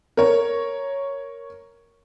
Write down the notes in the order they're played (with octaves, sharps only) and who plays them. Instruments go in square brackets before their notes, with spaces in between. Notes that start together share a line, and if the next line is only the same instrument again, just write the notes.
[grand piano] A#4 C#5